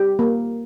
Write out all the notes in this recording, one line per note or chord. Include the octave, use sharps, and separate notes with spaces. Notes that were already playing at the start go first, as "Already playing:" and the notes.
Already playing: G3 G4
A#3